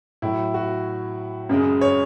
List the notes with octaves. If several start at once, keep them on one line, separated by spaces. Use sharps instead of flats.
A2 F#3 E4
F#4
F#2 C#3 G#3
C#5